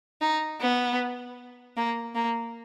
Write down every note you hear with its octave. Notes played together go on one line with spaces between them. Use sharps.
D#4
B3
A#3
A#3